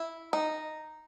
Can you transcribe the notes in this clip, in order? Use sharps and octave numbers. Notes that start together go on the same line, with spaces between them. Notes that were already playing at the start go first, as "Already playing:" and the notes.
Already playing: E4
D#4